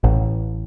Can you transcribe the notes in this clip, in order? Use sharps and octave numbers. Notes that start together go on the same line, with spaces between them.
A1